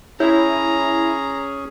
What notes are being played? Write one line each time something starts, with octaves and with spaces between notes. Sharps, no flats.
C#4 E4 G#4 C#5 A#5